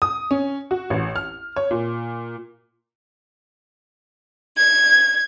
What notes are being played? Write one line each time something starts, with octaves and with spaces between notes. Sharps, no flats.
D#6
C#4
F#4
A1
F6
C#5
A#2
G#6